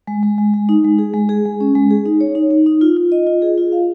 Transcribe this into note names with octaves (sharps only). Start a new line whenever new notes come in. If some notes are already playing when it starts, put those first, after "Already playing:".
G#3
G#3
G#3
G#3
D#4
G#3
G#4
G#3
G#4
G#3
C#4
G#3
G#4
D#4
C#5
D#4
D#4
D#4
F4
F4
D#5
F4
G#4
F4
F5